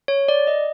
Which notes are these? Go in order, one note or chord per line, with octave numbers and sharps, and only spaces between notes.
C#5
D5
D#5